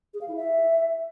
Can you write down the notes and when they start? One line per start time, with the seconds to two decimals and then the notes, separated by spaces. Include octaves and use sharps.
0.14 G#4
0.21 F5
0.28 E4
0.36 E5